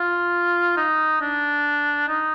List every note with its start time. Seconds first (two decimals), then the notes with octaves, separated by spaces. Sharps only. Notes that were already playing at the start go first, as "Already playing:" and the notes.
Already playing: F4
0.77 D#4
1.22 D4
2.08 D#4